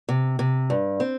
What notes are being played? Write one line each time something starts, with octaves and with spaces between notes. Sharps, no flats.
C3
C3
G2
C4